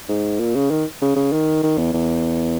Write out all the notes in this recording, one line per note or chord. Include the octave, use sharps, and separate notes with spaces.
G#2
A#2
C#3
D#3
C#3
C#3
D#3
D#3
E2
E2